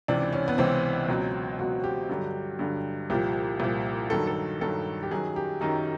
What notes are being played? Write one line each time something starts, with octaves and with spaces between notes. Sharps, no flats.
C#2 C3 E3 D4
C#4
B3
C#2 C3 E3 C4
C#2 B2 F#3
C#2 B2 F#3 F#4
G4
G2 D3 F#3
G2 D3 F#3
C2 A#2 F3 G4
C2 A#2 F3
G2 D#3 F#3 A4
A4
G2 D#3 F#3 A4
G4
F#2 D#3 F#3 G#4
G4
F#2 D#3 F#3 D#4